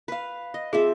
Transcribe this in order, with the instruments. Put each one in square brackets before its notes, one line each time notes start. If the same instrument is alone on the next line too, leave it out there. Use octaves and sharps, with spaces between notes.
[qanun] B4 F5
D#5
[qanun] F3 C4 E5 [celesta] G#4